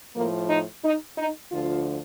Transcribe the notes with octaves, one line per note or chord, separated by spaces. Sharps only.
A2 F3 A#3
D#4
D#4
D#4
D2 D3 F3 F4